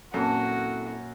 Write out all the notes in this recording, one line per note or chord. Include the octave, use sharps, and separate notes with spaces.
F#2 A#2 A#3 C4 E4 F#4 A4